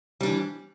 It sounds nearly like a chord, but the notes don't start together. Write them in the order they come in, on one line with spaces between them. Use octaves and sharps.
G3 D4 E3